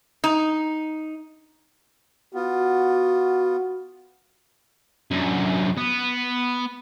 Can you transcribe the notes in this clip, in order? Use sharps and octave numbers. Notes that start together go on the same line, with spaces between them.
D#4
B3 F4 F#4
F#2 D3
B3